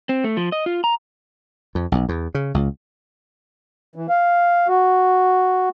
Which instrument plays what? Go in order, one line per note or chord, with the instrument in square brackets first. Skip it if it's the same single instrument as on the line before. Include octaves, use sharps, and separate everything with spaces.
[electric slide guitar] C4
A3
F3
D#5
F4
A#5
[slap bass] F2
B1
E2
C#3
C#2
[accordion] E3
F5
F#4